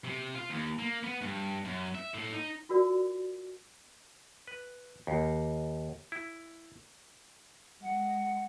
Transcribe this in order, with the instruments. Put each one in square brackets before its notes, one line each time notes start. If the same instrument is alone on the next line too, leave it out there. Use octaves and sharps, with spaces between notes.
[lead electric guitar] C3
F4
D#2
A#3
B3
G2
F#2
E5
A2
D#4
[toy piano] F4 F#4 A#4 D5
[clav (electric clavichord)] B4
D#2
E4
[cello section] G#3 [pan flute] F#5